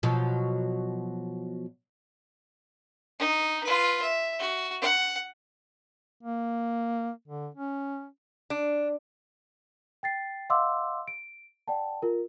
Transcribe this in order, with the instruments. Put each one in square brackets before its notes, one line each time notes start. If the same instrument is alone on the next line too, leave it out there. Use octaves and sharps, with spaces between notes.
[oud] B2 F3 F#3
[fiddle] D#4
F4 B4
E5
F#4
F#5
[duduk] A#3
D3
C#4
[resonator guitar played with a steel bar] D4
[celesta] G5 A6 C7
D#5 F5 F#5 C6 D6 E6
D7
D5 F#5 G5 A5
F4 A#4